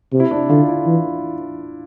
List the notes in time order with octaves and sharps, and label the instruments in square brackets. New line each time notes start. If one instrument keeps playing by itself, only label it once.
[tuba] C3
[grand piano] E4
D4
[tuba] D3 [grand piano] F4
[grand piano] E4
[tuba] E3